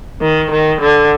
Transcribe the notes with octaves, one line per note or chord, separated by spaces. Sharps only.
D#3
D#3
D3